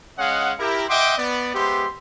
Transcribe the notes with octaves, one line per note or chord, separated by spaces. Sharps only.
G#3 C#4 D#5 F5 F#5
E4 G4 A#4
D#5 E5 F#5 G5 C6 D6
B3 D5
G#3 B3 G4 C5 E5 C6